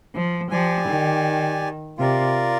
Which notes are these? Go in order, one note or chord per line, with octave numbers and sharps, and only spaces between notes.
F3
F3 G4 D5 G#5
D#3
C3 F4 A#4 D5